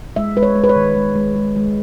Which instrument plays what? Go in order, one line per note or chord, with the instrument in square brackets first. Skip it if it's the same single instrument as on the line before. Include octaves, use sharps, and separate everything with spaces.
[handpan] G#3 E5
G#3 B4
C#5
G#3
B4
C#5
D#3
G#3
G#3
G#3
G#3